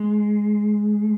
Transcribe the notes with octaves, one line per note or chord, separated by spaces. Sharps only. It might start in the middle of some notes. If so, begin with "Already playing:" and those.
Already playing: G#3